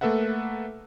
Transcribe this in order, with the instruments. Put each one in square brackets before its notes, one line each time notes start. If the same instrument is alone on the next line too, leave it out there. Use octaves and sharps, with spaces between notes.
[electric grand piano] A3 A#3 A4 B4 E5 F#5